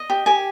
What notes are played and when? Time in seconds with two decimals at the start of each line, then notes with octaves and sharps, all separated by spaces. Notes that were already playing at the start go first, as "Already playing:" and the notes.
Already playing: D#5
0.10 G4
0.26 G4 G#5